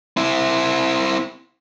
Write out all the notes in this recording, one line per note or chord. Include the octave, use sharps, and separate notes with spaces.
C4 E4